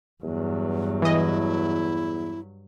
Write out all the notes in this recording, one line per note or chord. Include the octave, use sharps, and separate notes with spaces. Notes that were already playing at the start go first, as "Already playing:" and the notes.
E2 G2 F#3
E3 E4 D#5